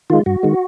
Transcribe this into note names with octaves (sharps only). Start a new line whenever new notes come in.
D#3 G#3 F4
G2 F#4
D#3 G#3